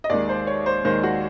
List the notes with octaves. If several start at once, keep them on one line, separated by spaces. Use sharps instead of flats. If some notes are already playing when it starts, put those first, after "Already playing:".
D#5
D#2 D#3 G#3 D5
C5
C#5
C5
D#2 D#3 G#3 C5
F#4